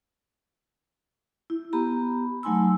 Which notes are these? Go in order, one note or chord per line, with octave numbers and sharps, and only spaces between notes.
E4
B3 G4 A#5 B5
F#3 A3 D#4 G#5 C6 E6